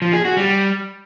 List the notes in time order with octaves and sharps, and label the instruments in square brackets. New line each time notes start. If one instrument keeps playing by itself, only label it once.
[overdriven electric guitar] F3
G#4
F#4
G3